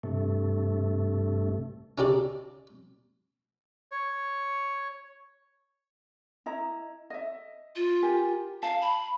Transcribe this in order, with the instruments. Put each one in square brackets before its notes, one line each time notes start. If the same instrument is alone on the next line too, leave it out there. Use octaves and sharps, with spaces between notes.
[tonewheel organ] G2 C3 A3
[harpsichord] C#4 D#4 G4 A4 D5
[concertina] C#5
[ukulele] E4 D#5 A#5
D#5 E5
[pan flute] F4
[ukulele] G4 A#4 G#5
[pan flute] F5 [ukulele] A5
[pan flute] B5